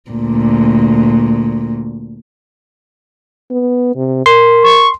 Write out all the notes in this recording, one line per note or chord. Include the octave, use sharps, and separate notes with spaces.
D2 A#2
B3
C3
A#4 C6
C#6